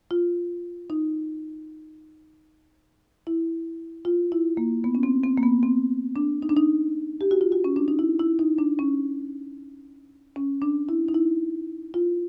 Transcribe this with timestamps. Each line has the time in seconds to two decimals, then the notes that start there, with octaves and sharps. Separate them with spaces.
0.11 F4
0.90 D#4
3.27 E4
4.05 F4
4.32 E4
4.57 A#3
4.84 B3
4.95 C#4
5.03 C4
5.24 C4
5.38 A#3
5.43 B3
5.63 C4
6.16 D4
6.42 D#4
6.49 D4
6.56 D#4
7.21 G4
7.31 F#4
7.41 F4
7.52 F#4
7.64 C#4
7.76 D4
7.88 D#4
7.99 E4
8.20 E4
8.39 D#4
8.58 D4
8.79 C#4
10.36 C#4
10.62 D4
10.89 E4
11.08 D#4
11.14 E4
11.94 F4